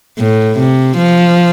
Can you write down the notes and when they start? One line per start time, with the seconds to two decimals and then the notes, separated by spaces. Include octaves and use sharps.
0.19 A2
0.58 C3
0.97 F3